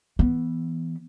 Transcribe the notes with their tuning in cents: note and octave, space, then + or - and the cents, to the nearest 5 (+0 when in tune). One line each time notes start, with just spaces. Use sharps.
E3 +0 B3 +0